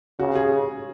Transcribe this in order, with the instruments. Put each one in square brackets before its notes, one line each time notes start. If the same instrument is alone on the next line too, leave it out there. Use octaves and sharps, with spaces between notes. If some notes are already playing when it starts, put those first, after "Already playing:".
[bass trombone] C#3 [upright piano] F#4
[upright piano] G#4